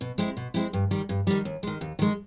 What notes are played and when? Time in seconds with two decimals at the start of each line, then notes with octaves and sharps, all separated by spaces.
0.01 B2
0.18 G#3 C4 E4
0.37 B2
0.54 G#3 C4 E4
0.73 G2
0.91 D#3 G3
1.09 G2
1.27 D#3 G3
1.45 D#2
1.63 D#3 G#3
1.81 D#2
1.99 D#3 G#3